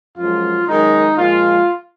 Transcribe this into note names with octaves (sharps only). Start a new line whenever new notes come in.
F#2 F3 G#3 F4
F#2 D#3 G#3 D#4
A#2 F3 G#3 F4